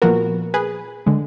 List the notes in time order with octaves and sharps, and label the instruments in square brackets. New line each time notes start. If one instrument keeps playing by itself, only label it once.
[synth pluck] A#2 F3 B3 F#4 A#4
G#4 B4
D3 G#3